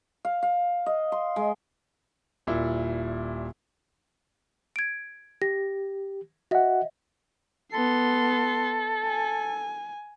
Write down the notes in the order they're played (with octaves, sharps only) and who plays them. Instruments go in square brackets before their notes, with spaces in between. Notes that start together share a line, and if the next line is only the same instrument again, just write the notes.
[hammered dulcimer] F5
F5
D#5
C6
G#3
[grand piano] D#1 A#2 E4
[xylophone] G#6 D7
[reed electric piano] G4 [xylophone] A#6
[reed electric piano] F#4 F#5 [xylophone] D#5 E5
[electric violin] B3 C6 [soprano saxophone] A4
[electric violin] G#5